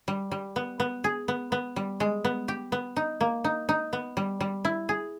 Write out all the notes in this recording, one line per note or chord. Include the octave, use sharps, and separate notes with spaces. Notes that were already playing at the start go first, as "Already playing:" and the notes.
G3
G3
B3
B3
G#4
B3
B3
G3
G#3
B3
G4
B3
D#4
A#3
D#4
D#4
B3
G3
G3
E4
G#4